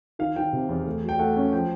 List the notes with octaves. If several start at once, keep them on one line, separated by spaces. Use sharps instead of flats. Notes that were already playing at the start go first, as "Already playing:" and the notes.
D#3 F5
D#3 G5
C3
E2
A3
F#3
G5
A3 F#5
C#4
F3 G5